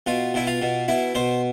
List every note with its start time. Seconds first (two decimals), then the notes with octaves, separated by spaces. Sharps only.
0.06 B2 F4
0.34 B2 E4
0.47 F4
0.62 B2
0.88 B2 E4
1.15 B2 C5